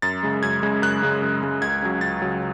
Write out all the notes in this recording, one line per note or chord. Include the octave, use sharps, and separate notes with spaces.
F#2 A6
C#3 G#3
F#2 G#6
C#3 G#3
F#2 F#6
C#3 G#3
F#2
C#3 G#3
C#2 G#6
C#3 F#3
C#2 A6
C#3 F#3